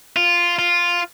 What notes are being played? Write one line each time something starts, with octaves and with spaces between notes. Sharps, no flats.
F4
F4